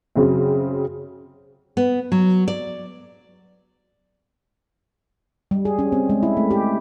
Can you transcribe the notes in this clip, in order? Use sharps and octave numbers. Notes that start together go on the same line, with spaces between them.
F#2 C#3 C4
B3
F#3
D5
G3
G#4
C#4
C4
G#3
E4
A3
G4